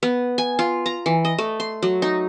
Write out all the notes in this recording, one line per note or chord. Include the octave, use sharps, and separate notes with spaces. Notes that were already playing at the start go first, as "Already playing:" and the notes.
B3
G#5
F4
A#5
E3
D#5
A3
C6
F#3
D#4